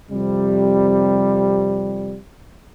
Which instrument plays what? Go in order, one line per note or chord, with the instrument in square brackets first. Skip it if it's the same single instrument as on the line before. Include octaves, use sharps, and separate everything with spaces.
[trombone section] F2 C3 G3